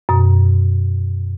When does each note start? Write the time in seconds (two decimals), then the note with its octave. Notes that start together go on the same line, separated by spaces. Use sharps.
0.09 F#2 B2